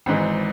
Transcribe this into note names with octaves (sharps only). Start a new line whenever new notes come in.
G#1 G#2 E3